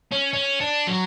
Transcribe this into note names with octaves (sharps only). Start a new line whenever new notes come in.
C#4
C#4
D4
F#3